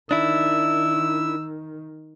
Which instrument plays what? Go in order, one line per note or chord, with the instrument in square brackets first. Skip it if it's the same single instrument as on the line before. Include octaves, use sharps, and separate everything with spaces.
[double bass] D#3 [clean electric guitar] D4 E4 [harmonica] E6